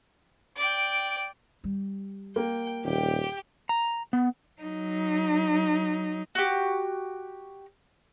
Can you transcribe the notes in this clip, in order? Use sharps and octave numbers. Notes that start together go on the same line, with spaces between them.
D5 G5
G3
A#3 G5
D#1 G4 G5
A#5
B3
F#3 D#4
F#4 G4